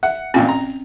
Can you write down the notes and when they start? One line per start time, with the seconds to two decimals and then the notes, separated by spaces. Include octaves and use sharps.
0.03 E5 F#5
0.34 A1 A#2 C4 C#4 F4 G5
0.49 A#5